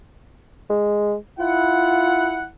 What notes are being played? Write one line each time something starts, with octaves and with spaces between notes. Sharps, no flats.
G#3
E4 F4 F#5